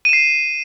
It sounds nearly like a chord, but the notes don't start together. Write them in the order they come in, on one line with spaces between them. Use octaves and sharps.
D#7 E7 C7